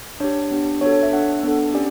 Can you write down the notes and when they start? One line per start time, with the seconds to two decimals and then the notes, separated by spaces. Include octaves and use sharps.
0.20 D4 G4 C#5
0.51 B3 D4 G4
0.81 B3 D4 F#4 A4 C#5
0.93 C#5
1.03 E5
1.12 D4 A4 F#5
1.43 B3 D4 A4
1.74 C#4 G4 D5